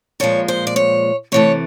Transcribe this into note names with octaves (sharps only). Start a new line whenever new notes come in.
A#2 F3 G#3 C#5
C5
D5
C#5
C3 E3 A3 C#5